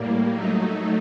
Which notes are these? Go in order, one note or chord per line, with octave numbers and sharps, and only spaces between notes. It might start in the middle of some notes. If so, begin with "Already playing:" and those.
Already playing: A2 G3 A#3
F#3 A3 D#4